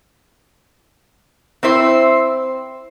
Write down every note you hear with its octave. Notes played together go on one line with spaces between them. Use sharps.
C4 E4 C5